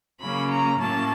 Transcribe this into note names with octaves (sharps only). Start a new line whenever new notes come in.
C#3 F#3 A#3 C#4 B5
A#5
A2 F#3 A#3 C#4 A5